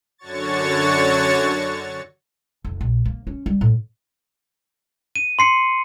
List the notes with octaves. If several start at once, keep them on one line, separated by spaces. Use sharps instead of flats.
F#2 D3 F#4 C#5 C#6 A6
F1
A#1
A#3
C#4
G3
A2
D#7
C6 C7 C#7